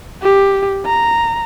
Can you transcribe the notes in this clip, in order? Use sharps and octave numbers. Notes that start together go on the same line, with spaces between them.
G4
A#5